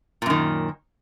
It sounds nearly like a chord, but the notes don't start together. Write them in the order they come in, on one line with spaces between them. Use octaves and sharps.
A#2 F#2 D#3